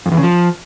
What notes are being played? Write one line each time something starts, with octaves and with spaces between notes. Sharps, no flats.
F2
E2
C#3
F3